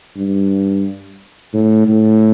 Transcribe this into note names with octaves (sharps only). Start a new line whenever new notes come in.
G2
A2
A2